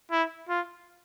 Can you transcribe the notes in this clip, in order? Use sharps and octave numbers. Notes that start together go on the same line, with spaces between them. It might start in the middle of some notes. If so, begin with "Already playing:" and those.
E4
F4